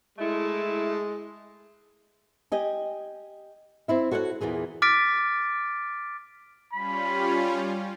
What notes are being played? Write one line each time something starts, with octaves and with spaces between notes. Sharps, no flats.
G#3 A3 E4
G4 D#5 G#5
C4 E4 E5
F#4 A4 C#5 D#5 F#5
E2 A#2 E3 G#4
D6 F6 A6 B6 D7
G3 C#4 F4 B5